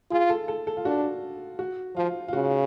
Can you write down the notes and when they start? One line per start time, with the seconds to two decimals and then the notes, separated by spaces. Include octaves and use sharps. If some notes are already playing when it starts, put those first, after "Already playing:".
0.11 F4 G#4
0.30 A4
0.48 A4
0.67 A4
0.77 F4
0.85 D4 F#4
1.59 F#4
1.96 F3 F4
2.28 F4
2.33 C#3 F#4